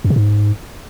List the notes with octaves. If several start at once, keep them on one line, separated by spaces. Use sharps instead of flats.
F#2
C3
G#2